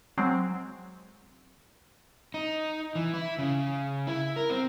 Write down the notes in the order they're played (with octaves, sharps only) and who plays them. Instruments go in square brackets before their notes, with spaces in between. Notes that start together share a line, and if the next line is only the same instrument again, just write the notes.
[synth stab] F#3 G#3 C4
[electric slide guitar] D#4
E3
E4
C#3
E4
A#4
C4